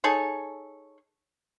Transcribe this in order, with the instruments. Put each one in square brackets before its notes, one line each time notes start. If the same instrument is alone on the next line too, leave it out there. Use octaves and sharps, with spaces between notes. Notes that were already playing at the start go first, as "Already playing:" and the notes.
[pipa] D#4 G#4 A4 C#5